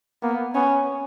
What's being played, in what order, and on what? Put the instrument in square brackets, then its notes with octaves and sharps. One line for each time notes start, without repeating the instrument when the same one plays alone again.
[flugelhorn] A#3 [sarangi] B3
[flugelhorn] B3 [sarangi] C#4